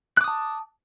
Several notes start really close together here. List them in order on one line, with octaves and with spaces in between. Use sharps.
F#6 D6 D#6 A5